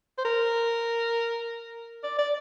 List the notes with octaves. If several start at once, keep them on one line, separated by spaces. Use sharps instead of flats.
C5
A#4
D5
D5